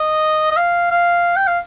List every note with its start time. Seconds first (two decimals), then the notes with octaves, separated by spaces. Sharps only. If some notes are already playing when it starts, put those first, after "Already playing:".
Already playing: D#5
0.51 D#5
0.57 F5
0.91 F5
1.36 G5
1.47 F5